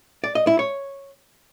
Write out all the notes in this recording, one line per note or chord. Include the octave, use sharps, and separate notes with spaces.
D5
D#5
E4
C#5